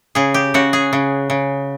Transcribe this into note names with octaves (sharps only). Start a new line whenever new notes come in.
C#3 G#4
G4
C#3 F#4
G#4
C#3
C#3